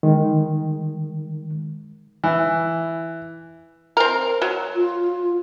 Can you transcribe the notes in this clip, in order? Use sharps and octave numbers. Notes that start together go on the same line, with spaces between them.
D#3 G#3
E3
C4 A#4
F#3
F4